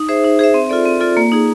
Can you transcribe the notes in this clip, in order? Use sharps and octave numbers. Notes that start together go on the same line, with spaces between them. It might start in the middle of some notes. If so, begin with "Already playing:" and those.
Already playing: D#4
G#4 C5 E5
D#4
G#4 C5 E5
C4
F4 A4 D5
C4
F4 A4 D5
A#3
D#4 G#4